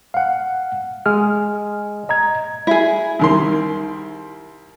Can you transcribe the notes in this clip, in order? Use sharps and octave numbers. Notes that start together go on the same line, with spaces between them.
F5 F#5
G#3 G#4 F6
D#5 A#5 G#6
E4 G#4
C2 D#3 C6